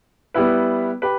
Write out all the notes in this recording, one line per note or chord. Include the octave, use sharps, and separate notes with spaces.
G3 B3 E4 B4
G4 B4